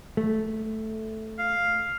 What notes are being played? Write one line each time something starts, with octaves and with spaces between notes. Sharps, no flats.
A3
F5